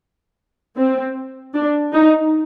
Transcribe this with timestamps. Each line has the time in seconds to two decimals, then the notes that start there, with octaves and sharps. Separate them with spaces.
0.77 C4
1.54 D4
1.93 D#4